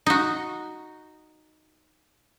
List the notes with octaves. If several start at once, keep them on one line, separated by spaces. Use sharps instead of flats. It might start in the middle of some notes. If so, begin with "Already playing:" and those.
D#4 F#4